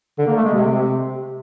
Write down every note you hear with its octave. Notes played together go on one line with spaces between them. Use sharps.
D3
A#3
A3
G#3
C3